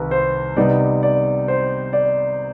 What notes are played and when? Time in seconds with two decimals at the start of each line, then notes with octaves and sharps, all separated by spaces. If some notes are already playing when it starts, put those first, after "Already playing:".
Already playing: C2 C3 D#3 B4
0.11 C5
0.57 C3 G3 B3 D#4 D5
1.03 D5
1.48 C5
1.93 D5